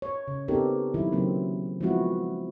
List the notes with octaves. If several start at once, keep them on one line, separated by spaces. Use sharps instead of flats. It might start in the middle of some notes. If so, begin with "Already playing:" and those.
C#5
C#3
B3 C4 D#4 G4 A4 A#4
D#3 F#3 E4
C#3 F#3 A#3 C4
F3 G#3 B3 C4 E4 F#4